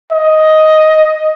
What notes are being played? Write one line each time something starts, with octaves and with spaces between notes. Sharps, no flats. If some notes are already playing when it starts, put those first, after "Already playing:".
D#5